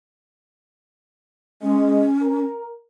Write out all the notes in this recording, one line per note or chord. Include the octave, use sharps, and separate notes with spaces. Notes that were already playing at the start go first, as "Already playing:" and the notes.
G#3 C#4
A#4